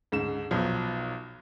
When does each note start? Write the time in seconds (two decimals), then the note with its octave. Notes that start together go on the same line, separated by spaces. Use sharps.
0.12 D2 G#2 C#3 E7
0.51 B1 F3 F#3 B3